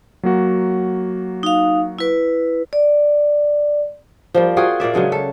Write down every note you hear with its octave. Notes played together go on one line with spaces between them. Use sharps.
F#3 A#3 F#4
D#4 F5
E4 B4
D5
F3 G3 A#3
F4 F#4 G#4 G5
A#2 A#3 D5 E5
C#3 F#3 G#3 D4
A4